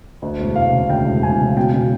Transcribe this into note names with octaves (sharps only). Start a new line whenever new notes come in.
D2
E1
E1 F5
C#3
D2 G5
E1
E1 G#5
C#3
B2 G5
B2